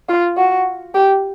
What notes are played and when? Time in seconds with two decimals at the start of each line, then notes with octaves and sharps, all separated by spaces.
0.09 F4
0.37 F#4
0.95 G4